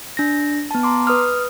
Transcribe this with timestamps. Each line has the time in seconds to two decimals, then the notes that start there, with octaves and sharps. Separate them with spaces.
0.17 D4 A#6
0.71 B3 A5
0.83 A#5 C6 D6
1.07 B4 D#6 F6